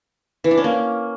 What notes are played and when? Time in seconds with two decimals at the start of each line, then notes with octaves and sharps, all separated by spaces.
0.44 E3
0.51 D4
0.57 C#4
0.64 A#3